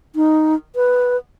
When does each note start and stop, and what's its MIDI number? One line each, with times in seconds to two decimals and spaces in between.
0.16 0.55 63
0.76 1.17 71